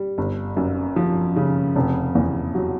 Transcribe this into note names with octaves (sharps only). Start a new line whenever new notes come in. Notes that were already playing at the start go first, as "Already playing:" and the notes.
Already playing: G3
G1
F#2
F3
C#3
F1
E2
F#3